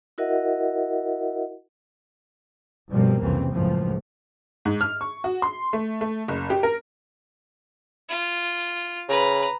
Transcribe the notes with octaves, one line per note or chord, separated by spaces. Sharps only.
E4 F#4 A#4 D#5 E5 F#5
G2 B2 F3 G3 A#3 C4
C2 F2 C#3 E3 C4
C#2 F#2 A2 F3
G#2
F6
C#6
F#4
C6
A3
A3
F#1
G4
A#4
F4
C#3 B4 A#5